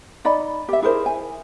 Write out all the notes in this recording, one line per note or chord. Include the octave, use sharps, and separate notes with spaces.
D#4 D5 D#5 B5
G4 E5
E4 G#4 A#4 C5
G#5